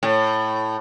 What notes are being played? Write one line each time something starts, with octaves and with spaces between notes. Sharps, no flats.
A2